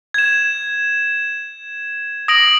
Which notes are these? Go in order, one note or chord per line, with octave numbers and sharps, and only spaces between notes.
G#6 E7
D#6 A#6 D7 F#7